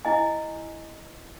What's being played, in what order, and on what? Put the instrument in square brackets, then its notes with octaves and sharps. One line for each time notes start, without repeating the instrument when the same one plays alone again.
[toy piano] E4 D#5 G#5